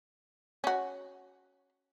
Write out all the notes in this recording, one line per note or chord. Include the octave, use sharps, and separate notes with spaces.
C#4 F#4